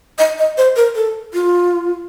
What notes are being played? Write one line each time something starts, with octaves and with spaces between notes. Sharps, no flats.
D#5
D#5
C5
A#4
A4
F4